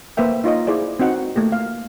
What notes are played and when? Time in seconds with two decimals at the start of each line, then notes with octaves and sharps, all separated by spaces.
0.17 A#3 B4 C5 E5 G5
0.44 D#4 F4 C#5 D#5
0.67 E4 G#4 C5 D5
1.00 C4 D#4 F#4 F#5
1.36 A3 A#3 G4
1.52 F5